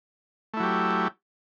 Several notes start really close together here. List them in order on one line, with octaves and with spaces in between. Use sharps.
A3 E4 F#3 G4